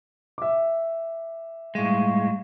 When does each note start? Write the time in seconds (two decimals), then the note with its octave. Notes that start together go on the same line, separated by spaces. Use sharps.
0.38 E5 D6
1.75 A2 G3 G#3 F5 C#6